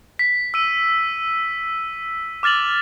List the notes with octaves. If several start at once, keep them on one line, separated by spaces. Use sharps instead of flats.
B6
E6 D#7
D6 F6 A6 F7 F#7